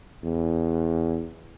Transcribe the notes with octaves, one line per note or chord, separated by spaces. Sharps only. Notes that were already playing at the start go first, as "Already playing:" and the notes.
E2